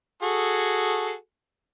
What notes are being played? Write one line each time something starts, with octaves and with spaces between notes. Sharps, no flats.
F#4 G#4 A4